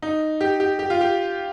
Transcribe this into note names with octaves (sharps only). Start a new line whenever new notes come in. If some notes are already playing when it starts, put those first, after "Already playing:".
D#4
G4
G4
G4
F4
G4